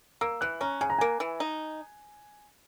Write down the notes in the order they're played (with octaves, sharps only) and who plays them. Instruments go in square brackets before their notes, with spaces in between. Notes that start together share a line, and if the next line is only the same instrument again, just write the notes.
[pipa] A#3 [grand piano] E6
[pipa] E3 [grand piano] F#6
[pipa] C#4 [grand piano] A#5
[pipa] C#3 [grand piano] G#5
[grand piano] A#5
[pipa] A#3 [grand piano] G#5
[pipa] E3
D#4